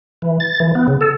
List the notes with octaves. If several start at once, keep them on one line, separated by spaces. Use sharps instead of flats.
E3
A6
E3
B3
C#3
A4